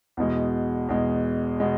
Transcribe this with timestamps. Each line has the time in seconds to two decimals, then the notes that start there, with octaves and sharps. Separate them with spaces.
0.17 E2 B2 G#3
0.89 E2 B2 G#3
1.60 B2 G#3